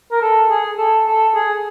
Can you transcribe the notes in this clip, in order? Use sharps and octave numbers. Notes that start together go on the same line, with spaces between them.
A#4
A4
G#4
A4
A4
G#4